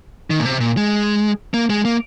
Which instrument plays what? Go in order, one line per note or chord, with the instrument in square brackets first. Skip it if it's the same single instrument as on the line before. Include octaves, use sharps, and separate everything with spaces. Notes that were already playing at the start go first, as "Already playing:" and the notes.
[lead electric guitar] D#3
A#2
C3
A#2
G#3
A#3
G#3
A#3